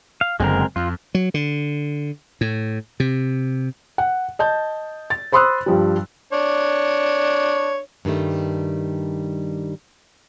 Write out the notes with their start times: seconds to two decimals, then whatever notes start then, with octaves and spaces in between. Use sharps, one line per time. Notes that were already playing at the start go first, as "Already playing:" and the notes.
0.21 F5
0.40 F#1 F#2 D3 G#3 C4 A#4
0.76 F2 F4
1.15 F#3
1.34 D3
2.41 A2
3.00 C3
3.98 F#5
4.39 D#5 A5 G6
5.10 A6
5.32 C5 B5 C6 D#6 E6 F#6
5.66 G2 F3 G3
6.33 D4 C#5
8.05 G2 D#3 G3 A3